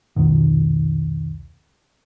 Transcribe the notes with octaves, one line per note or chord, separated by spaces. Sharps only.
C2 F2 B2 D#3